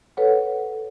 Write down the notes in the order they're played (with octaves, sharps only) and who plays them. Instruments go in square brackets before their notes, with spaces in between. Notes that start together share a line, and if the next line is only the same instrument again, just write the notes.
[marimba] A4 B4 C#5 F#5